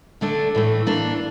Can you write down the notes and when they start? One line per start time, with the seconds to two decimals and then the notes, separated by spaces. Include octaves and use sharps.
0.21 D3 A3 D4
0.55 A2 E3 A3
0.87 E3 A#3 D4